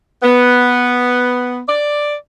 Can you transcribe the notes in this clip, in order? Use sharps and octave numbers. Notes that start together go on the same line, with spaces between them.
B3
D5